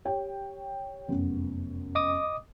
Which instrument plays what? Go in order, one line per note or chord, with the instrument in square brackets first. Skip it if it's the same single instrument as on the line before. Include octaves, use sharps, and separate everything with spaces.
[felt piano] G4 C#5 G5
F1 F#2 B3
[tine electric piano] D#5 D6 D#6